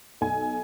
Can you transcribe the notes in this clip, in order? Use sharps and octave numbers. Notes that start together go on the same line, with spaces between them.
B1 G#5